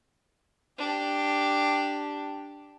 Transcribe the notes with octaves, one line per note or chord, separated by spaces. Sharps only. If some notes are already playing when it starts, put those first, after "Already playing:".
D4 G4